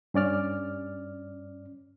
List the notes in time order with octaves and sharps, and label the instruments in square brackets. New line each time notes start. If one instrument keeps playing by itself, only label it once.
[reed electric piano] G2 C#4 D5 F6